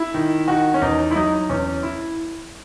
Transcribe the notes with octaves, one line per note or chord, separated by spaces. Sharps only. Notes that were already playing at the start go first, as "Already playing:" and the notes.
Already playing: E4
D#3
D#3 F#4
C#4
E2 D#4
E4
F#3 D#4
E2 C#4
E4